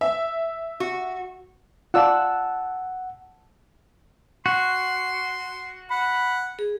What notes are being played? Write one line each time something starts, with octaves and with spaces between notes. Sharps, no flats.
E5
F#4
F4 D5 F#5 A5 E6 F#6
F#4 C6
F#5 B5
G#4